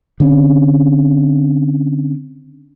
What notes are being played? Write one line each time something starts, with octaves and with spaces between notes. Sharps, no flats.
D3 C4 C#4